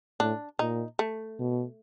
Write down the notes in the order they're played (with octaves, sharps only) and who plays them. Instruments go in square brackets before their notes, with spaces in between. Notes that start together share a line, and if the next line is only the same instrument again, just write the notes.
[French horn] A2 [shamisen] D4
[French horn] A#2 [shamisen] D#4
[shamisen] A3
[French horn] B2